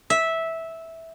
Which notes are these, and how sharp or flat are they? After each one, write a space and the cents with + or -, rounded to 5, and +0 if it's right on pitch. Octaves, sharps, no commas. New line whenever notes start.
E5 -10